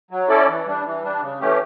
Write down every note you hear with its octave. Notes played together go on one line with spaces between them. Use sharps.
F#3
C#4 E4 A4 D5
E3
G3 D4
E3
G3 D4
C#3
E3 A3 C#4 G4